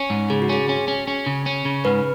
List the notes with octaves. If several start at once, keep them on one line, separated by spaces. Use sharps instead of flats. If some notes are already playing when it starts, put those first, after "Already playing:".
Already playing: C#4
G#2
C#3 G#4
F#4
C#4 G#4
C#4
C#4
C#4
C#3
C#4
C#3
G#2 B4